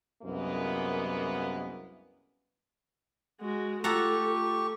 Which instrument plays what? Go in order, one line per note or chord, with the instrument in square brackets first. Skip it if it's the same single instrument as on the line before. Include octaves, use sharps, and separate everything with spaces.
[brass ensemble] C2 F#2 G#3 A#3 B3
[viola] G#3 F#4
[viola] A3 [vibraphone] F4 [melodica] G4 C#6 [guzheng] A4 F#5 A#5